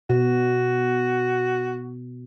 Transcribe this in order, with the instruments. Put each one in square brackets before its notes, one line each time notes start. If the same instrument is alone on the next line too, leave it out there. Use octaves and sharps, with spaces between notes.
[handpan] B2 [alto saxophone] F#4